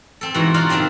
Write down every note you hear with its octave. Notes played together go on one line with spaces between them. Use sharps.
C4 A4
G#2 B2 E3 F#4 G#5 A#5
D#4 F4 F#4 D5 F5 F#5
C3 D#3 F#3 C4 D4